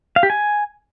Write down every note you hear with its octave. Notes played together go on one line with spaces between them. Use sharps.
F5
G4
G#5